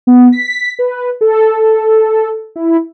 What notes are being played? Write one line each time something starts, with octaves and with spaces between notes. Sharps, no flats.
B3
B6
B4
A4
E4